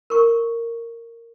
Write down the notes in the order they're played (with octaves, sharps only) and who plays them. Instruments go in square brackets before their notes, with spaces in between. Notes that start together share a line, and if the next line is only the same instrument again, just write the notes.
[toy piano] A#4 C#6